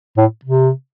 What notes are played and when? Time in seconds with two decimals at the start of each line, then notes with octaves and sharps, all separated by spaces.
0.17 A2
0.45 C3